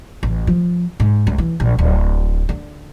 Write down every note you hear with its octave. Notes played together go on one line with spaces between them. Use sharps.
A1
F3
G#2
C#2
E3
A#1
D1
D3